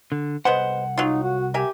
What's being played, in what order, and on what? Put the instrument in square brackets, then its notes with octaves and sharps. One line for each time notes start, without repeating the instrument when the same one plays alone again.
[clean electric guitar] D3
[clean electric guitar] C2 F#5 [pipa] G#3 B3 C5
[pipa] F#3 F4 [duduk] D#4
[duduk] F#4
[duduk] G4 [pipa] A#4 E5 G#5